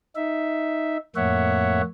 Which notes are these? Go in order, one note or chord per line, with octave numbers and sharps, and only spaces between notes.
D#4 E5
F2 A2 A#3 C#5 E5 F#5